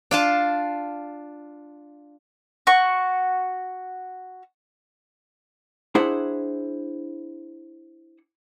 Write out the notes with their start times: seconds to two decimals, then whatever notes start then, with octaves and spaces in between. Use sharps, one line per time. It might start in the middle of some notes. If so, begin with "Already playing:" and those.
0.11 D4 F4 A5
2.67 F#4 C#6
5.95 D4 E4 G#4 C5 F#5